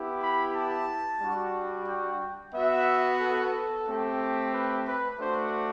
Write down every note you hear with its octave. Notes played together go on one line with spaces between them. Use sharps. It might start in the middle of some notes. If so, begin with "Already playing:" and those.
Already playing: B3 E4 G4
B5
A5
G3 D4 F#4
G5
B3 F#4 E5
A4
A3 C4 G4
B4
B4
A3 D4 F#4 C5